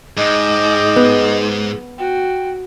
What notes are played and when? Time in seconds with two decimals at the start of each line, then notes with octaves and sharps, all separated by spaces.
0.17 G#2 D#5 G5 D6
0.96 B3
1.98 F#4 G5